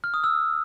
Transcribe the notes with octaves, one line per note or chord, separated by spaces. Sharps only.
F6
D#6
E6